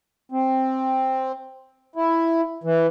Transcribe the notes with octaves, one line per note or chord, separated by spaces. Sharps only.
C4
E4
E3